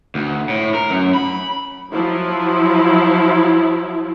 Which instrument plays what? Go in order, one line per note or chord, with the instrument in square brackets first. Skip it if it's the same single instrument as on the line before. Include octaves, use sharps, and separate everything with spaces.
[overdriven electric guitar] D2
A2
A#4
F#2
B5
[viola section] F3 F#3 E4